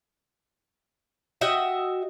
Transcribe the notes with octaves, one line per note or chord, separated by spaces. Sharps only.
F#4 D#5 E5 G5